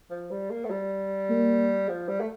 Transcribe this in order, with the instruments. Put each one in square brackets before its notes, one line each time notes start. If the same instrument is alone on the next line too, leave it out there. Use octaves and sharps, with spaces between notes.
[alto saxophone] F3
G3
A#3
A3
G3
[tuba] A#3
[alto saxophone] F3
G3
A3